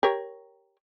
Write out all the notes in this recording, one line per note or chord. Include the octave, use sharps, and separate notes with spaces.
G4 A#4 C#5